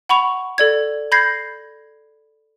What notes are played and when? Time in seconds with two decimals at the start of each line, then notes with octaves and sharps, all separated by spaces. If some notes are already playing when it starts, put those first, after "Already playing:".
0.09 F#5 B5 C#6 F7
0.58 A4 D5 G#6
1.12 B5 G6 G#6 A#6 C7